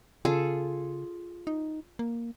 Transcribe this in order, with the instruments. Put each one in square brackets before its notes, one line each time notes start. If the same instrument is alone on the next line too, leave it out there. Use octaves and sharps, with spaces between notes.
[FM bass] C#3 [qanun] F4 G#4 A4
[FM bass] D#4
A#3